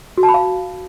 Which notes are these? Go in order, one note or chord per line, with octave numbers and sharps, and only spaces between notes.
F#4
A5
B5
F5